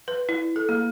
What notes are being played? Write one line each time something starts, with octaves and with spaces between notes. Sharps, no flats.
B4
E4
A4
A#3